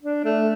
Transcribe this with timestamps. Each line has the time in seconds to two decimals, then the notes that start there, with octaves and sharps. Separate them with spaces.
0.03 D4
0.25 A3